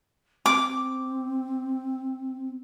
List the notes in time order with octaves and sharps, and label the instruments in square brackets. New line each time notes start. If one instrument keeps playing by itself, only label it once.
[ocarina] C4 [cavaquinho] D6